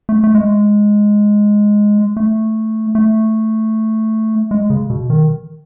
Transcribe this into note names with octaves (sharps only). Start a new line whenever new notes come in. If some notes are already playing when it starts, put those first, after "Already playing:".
A3
A3
G#3
A3
A3
G#3
C#3
B2
D#3